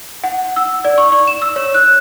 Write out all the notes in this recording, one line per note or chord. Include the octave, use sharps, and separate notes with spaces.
F#5
E6
D5
C#6
C#6
E7
E6
C#5
F#6